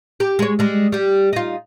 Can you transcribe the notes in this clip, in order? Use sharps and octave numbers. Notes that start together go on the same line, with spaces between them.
G4
G#3 C#5
G3 G#3
G3 G4
D#4 F4